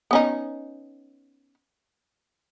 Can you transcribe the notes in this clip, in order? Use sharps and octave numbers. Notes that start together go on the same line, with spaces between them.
B3 C#4 D#4